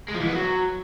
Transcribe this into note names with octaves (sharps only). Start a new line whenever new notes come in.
G#3
F3
E3
B3
F#3